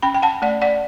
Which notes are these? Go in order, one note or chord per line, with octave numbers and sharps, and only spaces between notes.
C#4 G5 B5
G5
F#5 A5
A3 D5 F#5
D5 F#5